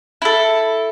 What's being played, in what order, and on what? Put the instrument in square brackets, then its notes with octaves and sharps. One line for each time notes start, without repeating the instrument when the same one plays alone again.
[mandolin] E4 A4